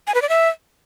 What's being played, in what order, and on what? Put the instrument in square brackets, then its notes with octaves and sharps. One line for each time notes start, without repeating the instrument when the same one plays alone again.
[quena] G#5
B4
D5
E5